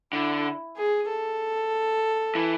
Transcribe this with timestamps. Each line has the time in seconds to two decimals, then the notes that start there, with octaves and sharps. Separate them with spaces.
0.13 D3 E4
0.77 G#4
1.08 A4
2.35 E3